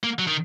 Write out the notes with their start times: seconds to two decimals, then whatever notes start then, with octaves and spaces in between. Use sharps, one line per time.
0.04 A#3
0.19 F#3
0.27 D#3